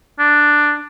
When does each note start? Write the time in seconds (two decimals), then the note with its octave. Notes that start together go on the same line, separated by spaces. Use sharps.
0.19 D4